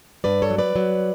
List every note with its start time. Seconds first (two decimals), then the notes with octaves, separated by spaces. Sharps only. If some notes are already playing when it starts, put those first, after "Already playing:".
0.24 G2 B4 D5
0.42 A4 C#5
0.50 F#3
0.58 B4 D5
0.76 F#3